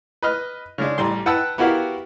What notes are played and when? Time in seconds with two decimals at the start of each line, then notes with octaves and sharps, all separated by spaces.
0.23 B4 D#5 F6
0.78 C#3 G#3 D4
0.98 A1 G3 C6
1.26 B4 F#5 G5 A5 E6 F#6
1.58 B3 E4 F#4 G4 A#4 F5